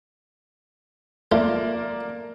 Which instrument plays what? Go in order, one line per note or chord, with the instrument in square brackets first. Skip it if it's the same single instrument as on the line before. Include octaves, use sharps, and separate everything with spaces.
[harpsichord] A3 F4 [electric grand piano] A#3 A#4 D5